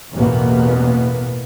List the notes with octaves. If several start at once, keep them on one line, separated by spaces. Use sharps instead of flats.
A1 E2 B2 A#3 B3